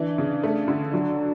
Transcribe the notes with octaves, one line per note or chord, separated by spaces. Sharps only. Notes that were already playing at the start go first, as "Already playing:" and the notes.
Already playing: E3 D4
C#3
A3
D3
F#3 D4